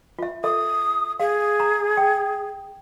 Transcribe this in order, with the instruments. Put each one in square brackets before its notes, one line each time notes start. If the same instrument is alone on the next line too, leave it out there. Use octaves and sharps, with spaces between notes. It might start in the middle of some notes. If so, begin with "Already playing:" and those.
[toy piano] F4 E5
[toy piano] A4 E5 [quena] D#6
[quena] G#4 [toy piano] F5
[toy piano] A#5
G5